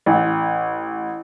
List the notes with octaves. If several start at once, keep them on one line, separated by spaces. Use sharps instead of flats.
A1